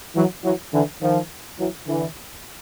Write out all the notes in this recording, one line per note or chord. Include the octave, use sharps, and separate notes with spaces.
E3 F#3
E3 F#3
D3 E3
D#3 F3
E3 F#3
D3 E3